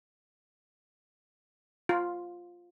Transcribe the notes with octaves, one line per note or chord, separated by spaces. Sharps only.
F4